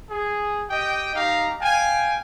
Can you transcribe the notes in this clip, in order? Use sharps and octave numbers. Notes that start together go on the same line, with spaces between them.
G#4
G4 D#5 G5
D#4 G4 F5 A#5
F5 G5 G#5